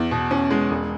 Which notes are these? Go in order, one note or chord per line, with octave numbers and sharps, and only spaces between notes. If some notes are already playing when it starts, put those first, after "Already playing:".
Already playing: E2
B2
C#4
G#3
E1